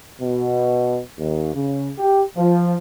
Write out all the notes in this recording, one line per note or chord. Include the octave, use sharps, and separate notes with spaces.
B2
D#2
C#3
G4
F3